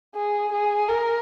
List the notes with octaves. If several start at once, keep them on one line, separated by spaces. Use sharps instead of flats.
G#4
G#4
A#4